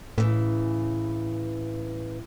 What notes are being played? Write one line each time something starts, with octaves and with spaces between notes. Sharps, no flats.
A2 C#3 E3